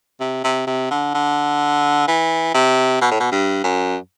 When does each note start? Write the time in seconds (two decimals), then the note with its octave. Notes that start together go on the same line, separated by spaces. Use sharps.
0.20 C3
0.44 C3
0.67 C3
0.91 D3
1.14 D3
2.08 E3
2.54 C3
3.01 B2
3.11 A2
3.20 B2
3.32 G2
3.64 F#2